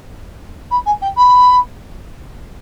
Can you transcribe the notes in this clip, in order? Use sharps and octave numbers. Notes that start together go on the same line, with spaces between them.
B5
G#5
G5
B5